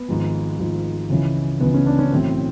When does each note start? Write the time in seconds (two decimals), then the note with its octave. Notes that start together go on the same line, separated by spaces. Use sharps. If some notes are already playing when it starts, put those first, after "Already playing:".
Already playing: B3
0.08 G#1 G#2 F3
0.59 G#1 G#2 F3
1.10 C#2 C#3 E3
1.60 C#2 C#3 E3 B3
1.74 C#4
1.86 D4
1.99 C#4
2.11 B1 A2 E3 C4